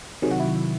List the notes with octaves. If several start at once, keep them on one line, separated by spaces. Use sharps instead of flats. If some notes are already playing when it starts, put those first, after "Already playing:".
C3 D#3 F#3 G#4
F#4
E4
F#4